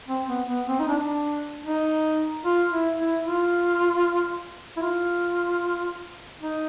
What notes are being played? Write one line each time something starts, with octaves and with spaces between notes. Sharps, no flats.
C4
B3
B3
C4
D#4
D4
D#4
F4
E4
E4
F4
E4
F4
D#4